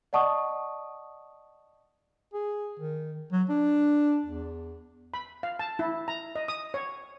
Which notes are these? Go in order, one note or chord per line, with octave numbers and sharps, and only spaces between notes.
D5 D#5 F#5 A5 C#6 D#6
G#4
D#3
F#3
D4
E2
B5
F5
A5
E4
A#5
D#5
D#6
C#5